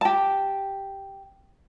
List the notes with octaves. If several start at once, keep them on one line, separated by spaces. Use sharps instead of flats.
G4 A5